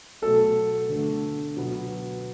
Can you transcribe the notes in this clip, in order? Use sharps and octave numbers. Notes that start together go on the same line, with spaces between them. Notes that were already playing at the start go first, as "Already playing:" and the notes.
B2 F#3 A3 A4
D3 A3
B2 F#3 B3